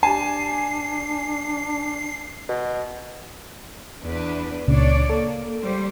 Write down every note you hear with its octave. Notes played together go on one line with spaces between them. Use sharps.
D4 G4 G#5 A5 C7
B2
E2 D4 B4
C#2 A#2 C#3 D4 C#5 D5
A#3 A4
G3 G#3 C5